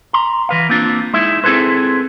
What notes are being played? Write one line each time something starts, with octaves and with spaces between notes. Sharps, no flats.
A#5 C6
E3 B4 F5
A#3 C4 D4 F4
G#3 D#4 E4 E5
C4 E4 G#4 A4 B4 C5